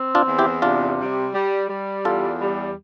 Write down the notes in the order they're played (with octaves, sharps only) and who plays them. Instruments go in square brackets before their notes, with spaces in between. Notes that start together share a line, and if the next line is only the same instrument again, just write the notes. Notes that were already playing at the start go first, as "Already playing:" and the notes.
Already playing: [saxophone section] C4
[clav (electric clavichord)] D4 F4
[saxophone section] E2
[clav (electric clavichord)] E4 G4
[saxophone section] C3 [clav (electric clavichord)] D4 F4
[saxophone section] G3
G3
G3
[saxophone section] E2 [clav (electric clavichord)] F4 A4
[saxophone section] G3